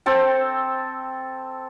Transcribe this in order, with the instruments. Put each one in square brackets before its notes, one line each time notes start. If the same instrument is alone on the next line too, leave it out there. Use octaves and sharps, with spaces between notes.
[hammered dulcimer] C4 A4 G5